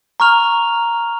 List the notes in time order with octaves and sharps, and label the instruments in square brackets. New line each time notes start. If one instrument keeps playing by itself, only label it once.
[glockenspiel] A#5 C#6 F6 F7